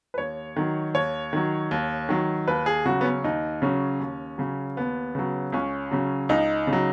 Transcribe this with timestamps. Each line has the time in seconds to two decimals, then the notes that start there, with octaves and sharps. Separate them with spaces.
0.14 B4
0.18 D#2 C#5
0.56 D#3 F#3
0.94 D#2 C#5
1.33 D#3 F#3
1.71 D#2
2.09 D#3 F#3
2.48 D#2 B4
2.66 G#4
2.85 C#3 F#3 F#4
3.01 B3
3.05 C#4
3.24 D#2 D#4
3.62 C#3 F#3 C#4
4.00 D#2
4.38 C#3 F#3
4.77 D#2 B3
5.15 C#3 F#3
5.52 C#2 C#4
5.91 C#3 F#3
6.29 C#2 D#4
6.67 C#3
6.73 F#3